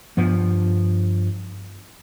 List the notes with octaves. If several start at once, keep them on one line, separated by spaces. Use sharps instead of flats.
G2 F3 B3